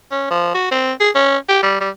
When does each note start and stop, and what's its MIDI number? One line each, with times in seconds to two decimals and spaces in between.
0.11 0.29 61
0.31 0.52 53
0.54 0.68 66
0.71 0.92 60
1.00 1.10 68
1.15 1.37 61
1.49 1.61 67
1.63 1.76 55
1.81 1.90 55